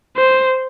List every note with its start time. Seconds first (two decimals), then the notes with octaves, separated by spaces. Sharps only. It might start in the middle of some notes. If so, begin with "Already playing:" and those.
0.17 C5